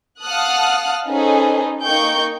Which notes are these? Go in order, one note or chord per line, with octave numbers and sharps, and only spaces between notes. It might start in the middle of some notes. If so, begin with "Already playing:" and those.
F5 F#5 A5 D#6 F6 F#6
C#4 D#4 G#4 A4 B4 C5
A#3 D#4 G5 C#6 G6